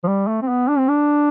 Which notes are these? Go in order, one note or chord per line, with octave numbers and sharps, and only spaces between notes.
F3
G3
A3
C4
B3
D4
C4
D4